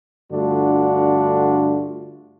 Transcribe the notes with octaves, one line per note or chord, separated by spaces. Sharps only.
G2 D3 A3 D4 F4 F#4